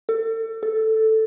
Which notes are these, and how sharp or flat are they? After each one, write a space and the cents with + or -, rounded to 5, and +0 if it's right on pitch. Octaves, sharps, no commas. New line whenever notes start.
A4 +35
A4 +0